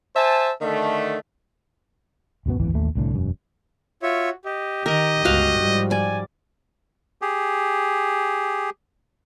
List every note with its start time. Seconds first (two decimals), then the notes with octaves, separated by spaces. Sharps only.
0.15 C5 E5 G#5 A5
0.60 D3 D#3 A3
2.46 D1 F#2 B2 B3
2.60 D1 G#1 E2 E3
2.73 A1 D#2 A3
2.95 C2 A2 D3
3.14 E1 F#2
4.03 F4 F#4 C#5 E5
4.45 G4 D#5
4.86 D#3 A#4 D#5
5.25 G1 C#2 F#4 F5
5.60 G#2 F3 G3
5.91 D5 G#5
7.22 G4 G#4